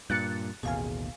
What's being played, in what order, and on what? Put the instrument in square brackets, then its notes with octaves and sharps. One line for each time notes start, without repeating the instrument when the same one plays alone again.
[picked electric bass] G2 A#2 [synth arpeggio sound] F#6 A6 C#7
[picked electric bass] A1 D#2 B2 [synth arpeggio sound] G#4 F5 G#5